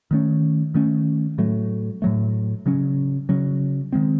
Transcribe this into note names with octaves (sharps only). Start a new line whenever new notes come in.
D#3 A3 C#4
D#3 A3 C#4
A2 F#3 A3
A2 F#3 A3
C#3 F#3 C#4
C#3 F#3 C#4
D#3 G#3 C4